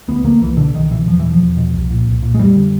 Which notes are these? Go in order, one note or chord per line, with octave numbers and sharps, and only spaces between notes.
D2 B3
D3 A#3
C2 E3
B2 D3
C2 D#3
B2 E3
E2 F3
B2 E3
F3
E2
B2
C2
A#2
C2
A#2
G#3
F2 G3
D3